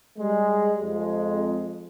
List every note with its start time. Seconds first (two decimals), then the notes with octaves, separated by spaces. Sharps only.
0.19 G3 G#3
0.81 F2 G#3